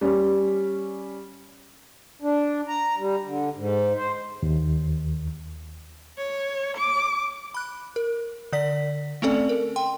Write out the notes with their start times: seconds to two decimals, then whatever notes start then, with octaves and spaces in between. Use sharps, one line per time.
0.01 G3 C#4
2.22 D4
2.68 A#5
2.98 G3
3.25 D3
3.56 G#2
3.96 C5
4.43 D#2
6.18 C#5
6.77 D6
7.54 B5 F#6
7.96 A#4
8.53 D3 D5 B6
9.22 A3 C4 C#4 A4 D5
9.49 A#4
9.76 G5 C6